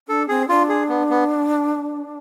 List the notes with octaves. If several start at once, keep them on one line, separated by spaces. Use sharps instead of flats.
D4 A4
C4 G#4
D4 F4
G#4
B3
B3